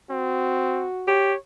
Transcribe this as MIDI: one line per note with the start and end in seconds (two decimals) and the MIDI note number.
0.10 0.87 60
0.10 1.23 66
1.07 1.34 67
1.07 1.38 73